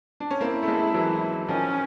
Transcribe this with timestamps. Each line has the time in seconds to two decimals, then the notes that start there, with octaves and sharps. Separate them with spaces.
0.20 D4
0.31 C#4
0.40 A#3 C4 E4
0.63 A3
0.67 G#3 A#3
0.94 E3 F#3
1.48 D#3 F3 C#4